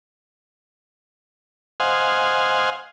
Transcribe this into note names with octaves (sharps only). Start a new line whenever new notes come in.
C5 D#5 F5 F#5 G#5